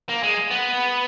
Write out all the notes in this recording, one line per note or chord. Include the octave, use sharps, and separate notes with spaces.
A#3
G#3
B3